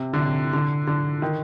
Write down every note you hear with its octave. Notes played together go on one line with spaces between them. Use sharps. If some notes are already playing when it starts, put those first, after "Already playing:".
Already playing: C3
D3
C3
D3
D3
D#3